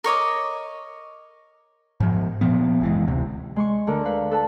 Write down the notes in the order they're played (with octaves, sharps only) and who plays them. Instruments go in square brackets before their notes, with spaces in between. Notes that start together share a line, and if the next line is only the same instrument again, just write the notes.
[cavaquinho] A#4 C#5 D#5 D6
[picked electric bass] G#2 F3
A#2 F3 B3
F#1 E3 G#3
D2 C3
[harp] G#3 C6 C#6
D2 D3 A#4
B4 F5
A4 B4 A5